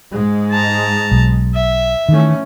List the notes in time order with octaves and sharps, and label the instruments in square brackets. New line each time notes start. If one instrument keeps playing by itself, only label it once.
[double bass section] G#2 G#3
[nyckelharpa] A5 A#5
[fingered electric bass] B1
[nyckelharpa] E5
[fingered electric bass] D#3 [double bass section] E3 A3 C#4